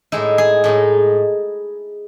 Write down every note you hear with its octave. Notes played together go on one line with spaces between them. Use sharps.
A2 G#3 D#4 E4
G#4
A2 G#3 D#4